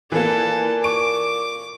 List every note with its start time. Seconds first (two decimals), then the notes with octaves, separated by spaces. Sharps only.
0.12 A#2 E3 A#3 A4
0.84 C#6 D6 D7